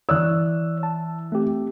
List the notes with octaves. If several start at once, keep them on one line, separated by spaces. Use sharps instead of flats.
E3 C#5 D5 E6 F#6
A5
A3 C4 G4